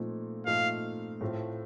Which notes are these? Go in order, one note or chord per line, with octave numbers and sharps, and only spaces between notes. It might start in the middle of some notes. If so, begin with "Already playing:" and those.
Already playing: A#2 F3 A3 C4 D#4
A#2 F3 A3 C4 D#4 F5
A2 A3 C4 F4